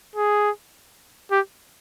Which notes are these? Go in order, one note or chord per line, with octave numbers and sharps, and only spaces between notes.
G#4
G4